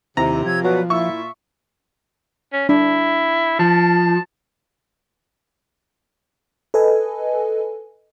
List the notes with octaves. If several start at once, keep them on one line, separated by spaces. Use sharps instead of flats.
D#2 C3 C4 E4 A#5
F3 C#5 E6 G#6
B2 F#3 F#4 B4 D5
A#2 E4 F4 E5 C#6
C#4
D4 E4
F3 A5
A4 B4 D#5 G#5